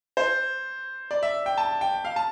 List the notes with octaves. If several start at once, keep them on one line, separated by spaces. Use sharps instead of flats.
C5
D5
E5
G5
A5
G5
F5
A5